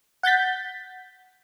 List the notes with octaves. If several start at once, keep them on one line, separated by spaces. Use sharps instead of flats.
F#5 G6 A6 B6